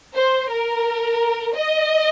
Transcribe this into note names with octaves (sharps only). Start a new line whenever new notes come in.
C5
A#4
D#5